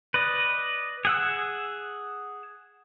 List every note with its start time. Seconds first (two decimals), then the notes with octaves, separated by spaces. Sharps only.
0.14 B4 D5 D#5
1.05 G#4 F#5 E6